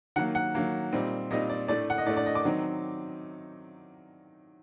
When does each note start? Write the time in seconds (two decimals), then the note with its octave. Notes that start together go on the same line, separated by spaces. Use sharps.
0.16 D#3 F#3 A#3 F#5
0.35 F#5
0.55 D#3 F#3 A#3
0.93 A#2 G3 C4 D#4
1.30 A#2 G3 C4 D#4 D#5
1.50 D5
1.68 A2 A3 D4 D5
1.90 F#5
1.98 D#5
2.06 A2 A3 D4 D5
2.16 D5
2.26 D#5
2.35 D6
2.45 D#3 F#3 C4 D#4